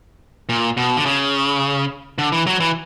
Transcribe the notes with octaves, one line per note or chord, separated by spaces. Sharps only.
A#2
B2
D3
C#3
D3
E3
F#3
E3